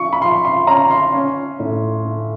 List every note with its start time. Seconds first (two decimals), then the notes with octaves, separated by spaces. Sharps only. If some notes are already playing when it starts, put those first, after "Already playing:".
Already playing: F3 C#6
0.13 B5
0.22 F3 C6
0.45 C6
0.67 C#4 A#5
0.91 C6
1.14 C#4
1.60 A2
2.05 A3